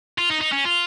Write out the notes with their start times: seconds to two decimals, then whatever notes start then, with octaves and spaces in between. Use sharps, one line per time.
0.18 F4
0.30 D#4
0.41 D#4
0.53 C#4
0.65 F4